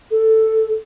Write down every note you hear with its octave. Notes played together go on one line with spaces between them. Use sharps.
A4